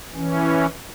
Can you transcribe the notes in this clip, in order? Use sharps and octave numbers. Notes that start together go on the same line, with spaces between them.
E3 C#4